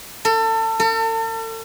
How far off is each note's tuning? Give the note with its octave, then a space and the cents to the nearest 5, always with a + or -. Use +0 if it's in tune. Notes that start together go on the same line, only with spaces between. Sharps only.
A4 +30
A4 +40